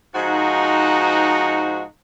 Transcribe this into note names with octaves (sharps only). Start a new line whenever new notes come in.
G#2 F3 D#4 F#4